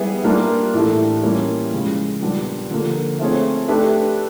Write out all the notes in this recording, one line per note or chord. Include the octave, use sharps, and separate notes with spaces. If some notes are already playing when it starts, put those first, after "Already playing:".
Already playing: G3 B3 E4 G#4
G3 A#3 D4 F4 A#4
A2 E3 A3 D4 G4
E3 G3 A#3 C#4 F4
C#3 F3 G#3
A#2 G3 B3 D4
D3 F3 A#3
A3 C4 F4 G#4 C#5
A3 D4 G4 B4